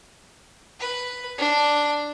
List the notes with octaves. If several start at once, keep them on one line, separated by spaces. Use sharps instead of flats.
B4
D4